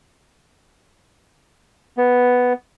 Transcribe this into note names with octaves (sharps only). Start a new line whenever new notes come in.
B3